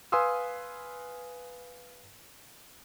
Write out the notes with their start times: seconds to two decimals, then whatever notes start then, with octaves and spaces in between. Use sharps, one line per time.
0.12 B4 F5 G#5 C6 D#6 E6